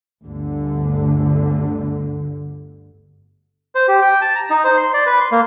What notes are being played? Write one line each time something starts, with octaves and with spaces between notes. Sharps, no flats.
G1 D2 D3
C5
G4
G5
A5
A#5
D#4
C5
C6
D5
B4
C6
A#3